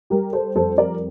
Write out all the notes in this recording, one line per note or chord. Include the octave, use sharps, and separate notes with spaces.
G3 G4 A#4
A4 C5
F2 A4 C5
A#4 D5